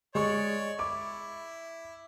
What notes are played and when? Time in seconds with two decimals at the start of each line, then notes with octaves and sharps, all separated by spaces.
0.15 G#3 C#5 D5 C#6
0.79 E4 D6